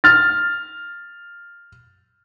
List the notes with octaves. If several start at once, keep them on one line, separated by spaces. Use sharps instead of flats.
F6 A6